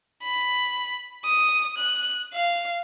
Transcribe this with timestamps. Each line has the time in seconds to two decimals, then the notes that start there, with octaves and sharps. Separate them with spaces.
0.23 B5
1.25 D#6
1.78 F#6
2.34 F5